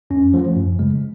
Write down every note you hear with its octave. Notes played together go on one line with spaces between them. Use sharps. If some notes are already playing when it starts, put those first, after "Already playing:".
F2 C#4
F3 A3
F#2
C#3 G#3